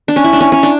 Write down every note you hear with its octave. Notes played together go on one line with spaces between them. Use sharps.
D4
C#4
E4
D4
C#4
C#4
D4